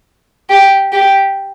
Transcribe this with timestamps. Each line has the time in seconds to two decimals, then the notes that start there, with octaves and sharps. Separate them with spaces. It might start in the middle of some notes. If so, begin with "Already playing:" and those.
0.50 G4
0.93 G4